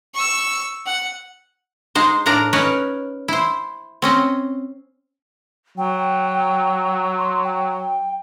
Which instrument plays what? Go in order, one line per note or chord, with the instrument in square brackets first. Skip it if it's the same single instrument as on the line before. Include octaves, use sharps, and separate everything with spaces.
[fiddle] C#6 E6
F#5
[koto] G#3 D#4 C5
A2 D4 A#4 A#5
C#4 D#4 A#4 B4 C#5
E4 C5
C4 C#4 D#5
[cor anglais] F#3 [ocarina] G5
[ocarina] C6
G5